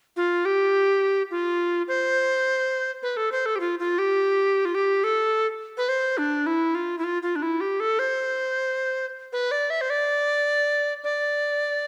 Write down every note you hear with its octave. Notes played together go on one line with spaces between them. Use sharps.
F4
G4
F4
C5
B4
A4
C5
A4
G4
F4
F4
G4
F4
G4
A4
B4
C5
D4
E4
F4
E4
F4
F4
D4
E4
G4
A4
C5
B4
D5
E5
C5
D5
D5